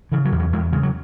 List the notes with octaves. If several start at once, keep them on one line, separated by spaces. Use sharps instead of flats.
C#3 E3
F#3
E2
F#3
E2 G#3
C#3 G#3
F#3